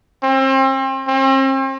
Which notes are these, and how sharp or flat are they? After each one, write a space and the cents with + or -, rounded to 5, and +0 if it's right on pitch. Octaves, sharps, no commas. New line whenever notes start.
C4 +35
C4 +40